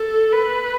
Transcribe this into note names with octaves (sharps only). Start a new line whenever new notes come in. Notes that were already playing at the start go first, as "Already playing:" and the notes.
Already playing: A4
B4